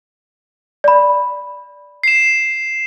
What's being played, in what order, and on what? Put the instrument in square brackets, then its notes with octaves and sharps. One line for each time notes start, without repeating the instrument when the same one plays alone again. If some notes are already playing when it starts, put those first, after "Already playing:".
[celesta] D5 B5
[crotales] C7 E7